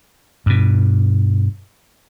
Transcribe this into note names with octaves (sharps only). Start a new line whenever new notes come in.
G2 B2